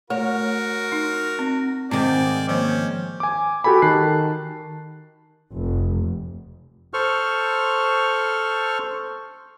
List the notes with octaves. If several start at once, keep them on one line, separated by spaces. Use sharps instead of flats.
A3 F#4 A#4 C#5
D#4
C4
G#2 D#3 C4 C5 D5 G#5
F3 A#3 C#4 C5
G#5 D6
F#4 G4 A4 G#5 B5
D#3 A5 F#6 C7
F1
A4 C5 C#6 F6